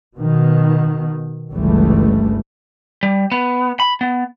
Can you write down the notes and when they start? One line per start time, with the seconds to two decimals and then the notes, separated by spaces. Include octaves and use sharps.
0.17 B2 D#3
1.53 G1 C#2 E3 G3 A3
3.03 G3
3.32 B3
3.80 B5
4.01 B3